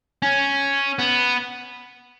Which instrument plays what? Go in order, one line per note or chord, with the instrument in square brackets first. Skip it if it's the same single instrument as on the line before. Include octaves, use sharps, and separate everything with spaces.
[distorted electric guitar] C#4
B3